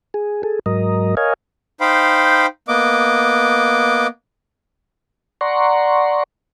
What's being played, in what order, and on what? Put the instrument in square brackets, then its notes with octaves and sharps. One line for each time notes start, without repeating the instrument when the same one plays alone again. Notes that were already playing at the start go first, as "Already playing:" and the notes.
[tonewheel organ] G#4
G#4 A4
G#2 F#3 A#4 D#5
A#4 C#5 D#5 F5 G#5
[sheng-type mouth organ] D#4 C5 F5 G5 B5
A#3 B3 D#5 D6
[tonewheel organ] D5 F#5 A#5 C6 C#6